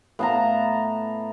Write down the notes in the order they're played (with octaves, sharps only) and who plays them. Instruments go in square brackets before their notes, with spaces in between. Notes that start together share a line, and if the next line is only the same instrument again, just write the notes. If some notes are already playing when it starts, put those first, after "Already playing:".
[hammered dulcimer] A2 F5 [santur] B3 A5 A#5